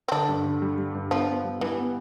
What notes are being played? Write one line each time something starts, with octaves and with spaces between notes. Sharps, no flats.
C4
D3 D4
G2
D3
G3
G3
G2
F3 B3
B3
G3
E3 G3
B3